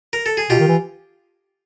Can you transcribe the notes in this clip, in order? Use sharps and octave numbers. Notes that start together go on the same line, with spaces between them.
A#4
A4
G#4
B2 F4 G4
D#3
E3